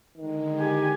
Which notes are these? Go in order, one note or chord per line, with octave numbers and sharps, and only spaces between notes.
D3 D#3 G#3
G4 G#5